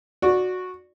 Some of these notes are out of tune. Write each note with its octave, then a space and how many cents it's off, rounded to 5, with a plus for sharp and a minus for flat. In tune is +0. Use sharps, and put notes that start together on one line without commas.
F#4 -10 D5 +0